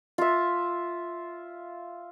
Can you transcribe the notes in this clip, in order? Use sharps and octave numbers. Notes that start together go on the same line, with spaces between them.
F4 E5